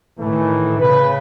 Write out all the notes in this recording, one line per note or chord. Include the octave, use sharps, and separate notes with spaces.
A2 D#3 E3 A3
C#3 B4